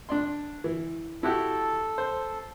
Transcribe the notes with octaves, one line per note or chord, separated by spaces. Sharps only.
D4 D5 C6
E3
E4 F#4 G4 A4
C5